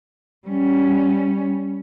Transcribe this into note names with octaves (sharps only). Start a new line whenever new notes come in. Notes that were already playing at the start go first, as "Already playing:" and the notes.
G3 C#4